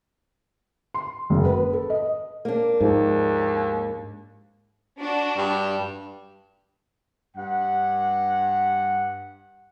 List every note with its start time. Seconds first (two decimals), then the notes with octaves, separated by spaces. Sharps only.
0.94 C6
1.30 F#1
1.45 B4
1.73 A4
1.90 D#5
2.45 A#3 D4
2.80 D#2 G#2 F3
4.99 D4 F#4
5.37 G2
7.36 G2 F#5